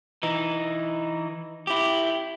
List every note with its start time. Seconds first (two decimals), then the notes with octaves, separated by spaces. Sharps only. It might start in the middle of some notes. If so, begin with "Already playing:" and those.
0.23 E3 D#4
1.67 E4 G4